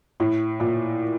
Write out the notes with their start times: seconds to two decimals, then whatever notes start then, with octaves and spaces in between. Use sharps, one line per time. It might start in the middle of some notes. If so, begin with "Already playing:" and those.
0.20 A2
0.60 A#2